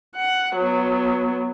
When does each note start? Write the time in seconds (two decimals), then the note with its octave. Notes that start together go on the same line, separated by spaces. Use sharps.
0.16 F#5
0.56 F#3 B3